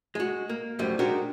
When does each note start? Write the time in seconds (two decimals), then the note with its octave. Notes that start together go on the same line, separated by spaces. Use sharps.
0.15 G#3 F#4
0.49 A#3
0.79 F#2 A2 F3 G3
0.99 G#3 D4 D#4 F#4 G4 A#4